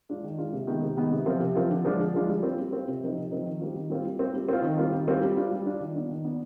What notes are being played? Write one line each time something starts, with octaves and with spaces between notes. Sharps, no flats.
G#3 D4 F4
D#3
G#3 D4 F4
C3
D#3 G#3 B3
C3
D#3 G#3 B3
C3
F3 C4 F4
C3
F3 C4 F4
D3
F3 G#3 D4 F4
D3
F3 G#3 D4 F4
G3
C4 F4
G3
C4 F4
C3
F3 C4 D#4
C3
F3 C4 D#4
D#3
G3 C4 F4
D#3
G3 C4 F4
G3
C4 F4
G3
C4 F4
D#3
G3 C4 F4
D#3
G3 C4 F4
G3
D4 F4
G3
D4 F4
D#3
B3 D4
D#3
B3 D4